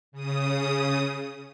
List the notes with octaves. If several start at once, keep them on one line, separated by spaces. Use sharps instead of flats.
C#3 D#6